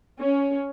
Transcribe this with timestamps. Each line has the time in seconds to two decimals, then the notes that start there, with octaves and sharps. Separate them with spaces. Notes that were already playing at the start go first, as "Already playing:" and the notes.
0.20 C#4